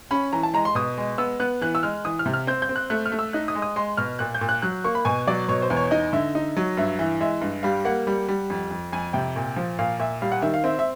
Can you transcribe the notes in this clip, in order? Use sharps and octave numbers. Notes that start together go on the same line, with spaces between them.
C#4 B5
E3 A#5
A5
G#3 A#5
C6
B2 D#6
G#3
B3 E6
B3 F#6
E3 F#6
E6
G#3 F6
E3 D#6
F6
C3
F6
C4 G6
G6
C4
F#6
A3 F#6
F6
A3
E6
D#4 F#6
D#6
G#3
D#6
G#3 C6
B2 F6
A#2 F#6
G6
A#2
F#6
F#3 F#6
A#3 C#6
B5
B2 G#5
F#3 D5
B2 C#5
C5
E2
C#5
D#4 D#5
D3 E5
D#4
F#3
G2 E5
E3 E5
G#3 E5
G2
G3 F5
A#3 F#5
G3
G3
F2
F2
F2 G#5
C3 G5
A#2
F3
A#2 F5
A#2 E5
G3 F5
F#5
D#3 E5
F5
C4 E5
E5